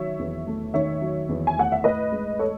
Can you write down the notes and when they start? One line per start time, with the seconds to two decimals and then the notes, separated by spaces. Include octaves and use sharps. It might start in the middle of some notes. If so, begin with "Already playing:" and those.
Already playing: D#3 F#3 C#5 E5
0.19 E2
0.47 A3
0.74 D#3 C#5 E5
1.01 F#3
1.29 E2
1.47 G#5
1.57 A3 F#5
1.72 E5
1.84 A2 B4 D#5
2.12 G#3
2.39 A4 C#5